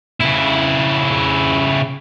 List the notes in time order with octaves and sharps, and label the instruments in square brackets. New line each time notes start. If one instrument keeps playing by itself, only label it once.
[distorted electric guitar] C#3 E4